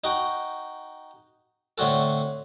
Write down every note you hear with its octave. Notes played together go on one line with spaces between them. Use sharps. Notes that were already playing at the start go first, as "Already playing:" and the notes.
D#4 F#4 G5
A2 D3 C4 F#4 A4